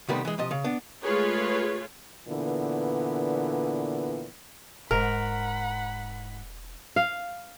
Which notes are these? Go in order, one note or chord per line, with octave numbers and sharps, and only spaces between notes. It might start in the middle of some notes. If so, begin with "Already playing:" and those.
C3 D#3 G3 A3 B3 B4
E3 G#3
C3 F3 D#5
C#3
B3 D4
G#3 A3 F4 G#4 B4 C#5
A#2 D3 E3 B3
E1 G#2 A#4 F#5 B5
F5